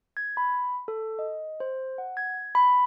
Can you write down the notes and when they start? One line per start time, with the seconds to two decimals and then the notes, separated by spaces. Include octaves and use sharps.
0.17 G#6
0.37 B5
0.88 A4
1.19 D#5
1.60 C5
1.98 F#5
2.17 G#6
2.55 B5